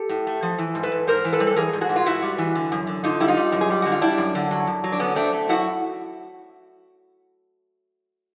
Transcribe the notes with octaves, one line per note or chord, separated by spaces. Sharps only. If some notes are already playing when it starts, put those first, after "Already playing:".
Already playing: G4 A4
A2
A3
F3
E3
G#2
A4 B4
G#2
G#2 A#4 C5
E3
A4 B4
G3
A4
E3 G#4 A#4
G#2
F#4 G#4
G#2
F4
G#2 E4 F#4
G3
E3
D3
F#2
D3
D3 D#4 F4
G3 E4
D#4 F4
G3
F#2
G#4
G3 G4
D3 F#4
F4
G3 D4 E4
F#2
D3
F#3
F#2
F#3
D4
D3 B3 C#4
A3 C4 D4
A3
F#2 E4 F#4